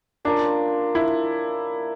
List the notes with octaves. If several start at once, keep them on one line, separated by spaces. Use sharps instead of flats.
A#3 C#4 D4 F4 A#4
E4